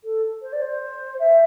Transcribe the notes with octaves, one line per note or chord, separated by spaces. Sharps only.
A4
C5
D5
C5
E5